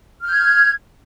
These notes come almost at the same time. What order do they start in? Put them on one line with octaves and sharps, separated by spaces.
F6 G6 G#6